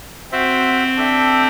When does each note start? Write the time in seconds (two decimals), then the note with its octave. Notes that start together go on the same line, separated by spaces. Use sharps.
0.32 C4 F#4 C5 E5
0.97 D4 A4 E5 G5